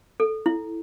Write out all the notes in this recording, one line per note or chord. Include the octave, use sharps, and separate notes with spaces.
A4
E4